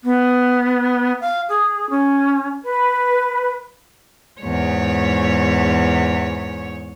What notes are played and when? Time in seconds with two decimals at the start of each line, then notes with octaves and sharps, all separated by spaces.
0.04 B3
1.21 F5
1.49 G#4
1.90 C#4
2.63 B4
4.41 E2 G#2 C#5